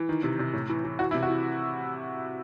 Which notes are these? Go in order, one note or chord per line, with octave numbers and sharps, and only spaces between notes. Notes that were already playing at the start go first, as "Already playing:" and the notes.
Already playing: E3
D#3
C3
C3
A2
E3
E3
E3 F#4
E4
C3
F#4
E3